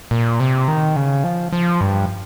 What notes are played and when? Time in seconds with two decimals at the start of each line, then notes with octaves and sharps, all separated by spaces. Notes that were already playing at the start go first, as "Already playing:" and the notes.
0.11 A#2
0.40 C3
0.68 D#3
0.96 C#3
1.24 F3
1.53 F3
1.81 G2